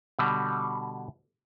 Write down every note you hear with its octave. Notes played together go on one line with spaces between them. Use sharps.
B2 D3 G3